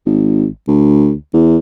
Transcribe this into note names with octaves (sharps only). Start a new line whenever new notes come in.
G#1
D2
E2